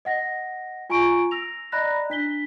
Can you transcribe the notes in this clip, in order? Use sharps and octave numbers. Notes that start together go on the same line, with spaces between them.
D#5 F#5 A#6
F4 G#5 A#5 C#6 D7
E6 A#6 F7
D5 D#5 A#5 B5 F#6 A#6
D4 B6 G7